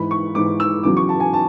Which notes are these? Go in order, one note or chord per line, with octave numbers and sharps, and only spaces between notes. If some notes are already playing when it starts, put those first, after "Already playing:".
Already playing: G#2 E3 B5
C#6
G#2 E3 D6
E6
E2 C#3 F#3 D6
C#6
A5
G#5
A5